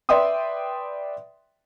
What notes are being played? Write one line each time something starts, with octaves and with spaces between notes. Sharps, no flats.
B4 D5 E5 G5 C6 D#6